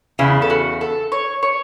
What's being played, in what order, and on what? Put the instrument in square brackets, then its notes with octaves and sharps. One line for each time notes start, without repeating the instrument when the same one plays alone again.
[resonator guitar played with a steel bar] E2 C#3 B3 [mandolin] E4
[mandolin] A4
F#4
A4
C#5
C#5